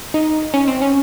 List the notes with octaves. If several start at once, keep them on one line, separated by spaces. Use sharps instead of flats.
D#4
C#4
C4
C#4